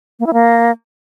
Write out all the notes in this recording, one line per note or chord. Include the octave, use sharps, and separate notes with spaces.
A#3
E4
A#3